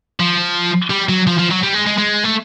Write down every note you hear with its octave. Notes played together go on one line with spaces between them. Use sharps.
F3
G3
F#3
F3
F3
F#3
G3
G#3
G#3
G#3
A3